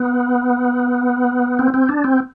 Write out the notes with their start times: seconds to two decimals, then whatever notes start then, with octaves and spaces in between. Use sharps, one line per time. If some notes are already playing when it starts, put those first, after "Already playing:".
Already playing: B3
1.59 C4
1.74 C4
1.89 D4
2.04 C4